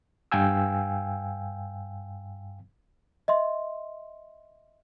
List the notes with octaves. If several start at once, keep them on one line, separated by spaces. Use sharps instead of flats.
G2 F5 G5 G#5 E6
D#5 E5 C6